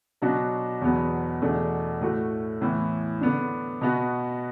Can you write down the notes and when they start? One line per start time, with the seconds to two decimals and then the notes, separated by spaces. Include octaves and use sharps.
0.22 B2 F#3 D4 F#4
0.81 E2 B2 F#3 B3
1.41 E2 B2 A3 D4
2.01 A2 A3 F#4
2.61 A2 E3 B3
3.21 D3 B3 D4
3.81 B2 B3 F#4